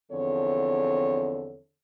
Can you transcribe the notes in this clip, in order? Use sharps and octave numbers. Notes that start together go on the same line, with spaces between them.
E2 D3 F3 C4 A4 C#5